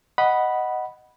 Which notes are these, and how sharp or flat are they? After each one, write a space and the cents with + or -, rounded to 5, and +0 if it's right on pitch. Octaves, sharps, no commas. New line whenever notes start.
D#5 +0 F#5 +5 B5 -10